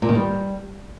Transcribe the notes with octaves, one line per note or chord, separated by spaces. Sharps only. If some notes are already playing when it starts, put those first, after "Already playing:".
A#2
D#3
G3